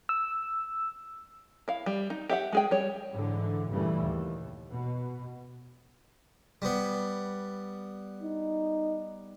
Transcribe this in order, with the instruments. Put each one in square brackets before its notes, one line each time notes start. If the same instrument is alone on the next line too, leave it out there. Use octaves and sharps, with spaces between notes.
[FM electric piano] E6
[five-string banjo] E4 F5
G3
D#4
G4 E5 F#5
G#3 G#4 G5
G3 C#5
[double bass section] G#2 D3 E3
G2 A#2 C#3 E3 G3 A3
D#2
B2
[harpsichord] G3 B3
[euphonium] D#4